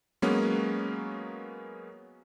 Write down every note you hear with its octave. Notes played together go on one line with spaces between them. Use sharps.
F#3 G#3 A#3 B3 C#4